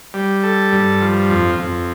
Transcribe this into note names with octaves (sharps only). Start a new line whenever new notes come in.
G3
A4
G2
F3
F2
F2